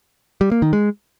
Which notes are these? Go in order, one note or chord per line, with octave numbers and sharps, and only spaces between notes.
G3
A#3
D#3
G#3